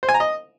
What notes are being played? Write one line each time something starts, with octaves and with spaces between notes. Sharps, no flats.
C5
G#5
A#5
D#5